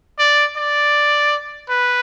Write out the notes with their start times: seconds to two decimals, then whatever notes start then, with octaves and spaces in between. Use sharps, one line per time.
0.19 D5
0.57 D5
1.70 B4